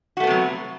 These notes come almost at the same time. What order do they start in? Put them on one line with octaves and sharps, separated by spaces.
F#4 A3 B3 C3 F#3